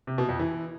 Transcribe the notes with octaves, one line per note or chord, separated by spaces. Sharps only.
C3
B2
F2
E3